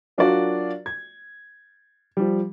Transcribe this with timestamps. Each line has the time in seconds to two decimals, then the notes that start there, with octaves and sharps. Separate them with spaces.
0.18 F#3 D4 F4 F#4 A#4 D5
0.86 G#6
2.17 F3 G3